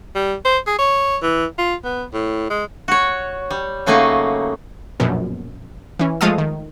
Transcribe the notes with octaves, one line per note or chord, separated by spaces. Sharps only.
G3
C5
G#4
C#5
E3
F4
B3
A2
G#3
F#4 C#5
G3
C#3 F#3 A3 A#3 C#4 D#4
A#1 F#2 B2
E3 C#4
F3 G#3 A3 A4 F5 D#6
D#3